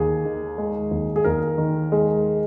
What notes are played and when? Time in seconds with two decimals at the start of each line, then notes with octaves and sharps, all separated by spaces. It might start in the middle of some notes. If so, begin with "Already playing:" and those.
Already playing: D#2 G#4
0.25 D#3
0.58 G#3
0.91 D#2
1.16 G#4
1.24 D#2 A#4
1.58 D#3
1.92 G#3